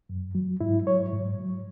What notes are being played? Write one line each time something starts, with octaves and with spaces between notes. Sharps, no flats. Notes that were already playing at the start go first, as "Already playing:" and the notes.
F#2
F#3
G#2 E4
F#3 C#5
G#2
F#3